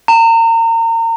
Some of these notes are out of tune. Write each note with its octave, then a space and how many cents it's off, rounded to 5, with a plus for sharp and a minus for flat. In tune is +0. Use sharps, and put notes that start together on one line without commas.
A#5 -35